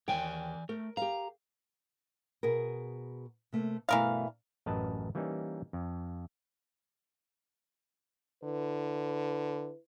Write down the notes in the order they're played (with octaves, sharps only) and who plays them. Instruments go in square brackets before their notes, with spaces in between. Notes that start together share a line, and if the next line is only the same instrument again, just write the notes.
[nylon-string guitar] D#2 G5 [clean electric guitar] E3 D5 G#5
[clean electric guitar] A3 [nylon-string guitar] A#4
[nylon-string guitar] G4 F5 [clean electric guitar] A#5
[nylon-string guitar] B2 G#4 A#4
C3 A3 A#3
[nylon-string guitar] G2 B2 A3 [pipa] E3 A#4 F5
[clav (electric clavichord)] A1 F#2 A#4 B4 D#5 A5
E3 G3 A#3 C#4 D#4
F2
[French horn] D3 [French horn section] E4 B4